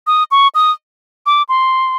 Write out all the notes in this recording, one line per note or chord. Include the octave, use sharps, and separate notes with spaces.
D#6
C#6
D#6
D6
C6